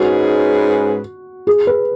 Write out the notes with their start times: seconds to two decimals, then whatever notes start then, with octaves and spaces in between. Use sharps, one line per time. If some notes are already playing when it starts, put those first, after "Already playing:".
Already playing: G#2 G#3 C#4 F#4 G#4 B4
1.47 G#4
1.67 B4